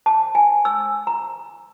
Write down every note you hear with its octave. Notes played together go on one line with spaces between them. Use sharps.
A5
G#5
E6
A#5